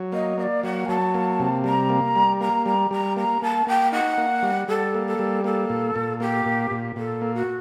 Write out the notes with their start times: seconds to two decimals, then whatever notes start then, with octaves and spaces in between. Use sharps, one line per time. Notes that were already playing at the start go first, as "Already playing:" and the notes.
Already playing: F#3
0.12 A#3 D#5
0.38 A#3 D#5
0.42 D5
0.63 F#3 F#5
0.88 F#3 A5
1.14 A#3
1.40 C3
1.64 G3 A#5
1.90 A#3
2.15 G3
2.40 A#3 A#5
2.66 G3 A#5
2.91 G3 A#5
3.17 A#3 A#5
3.42 A#3 A5
3.67 A#3 G5
3.92 D#4 F#5
4.18 A#3
4.43 G3
4.68 G3 A4
4.94 A#3
5.06 A4
5.19 G3
5.44 A#3 A4
5.70 A#2
5.96 A#2
6.20 A#3 G4
6.46 A#2
6.71 A#2
6.96 A#2 A4
7.21 A#3
7.34 F#4